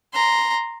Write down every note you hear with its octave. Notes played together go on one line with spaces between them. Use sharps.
A#5 C6